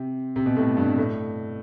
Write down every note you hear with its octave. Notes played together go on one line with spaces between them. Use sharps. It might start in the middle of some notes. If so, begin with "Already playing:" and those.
Already playing: C3
C3
B2
A2
G2
A2